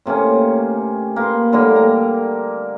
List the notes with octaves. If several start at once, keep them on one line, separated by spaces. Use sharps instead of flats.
A2 C3 A#3 C#4
A#3 B4 C6
A2 D3 G3 A#3
A#5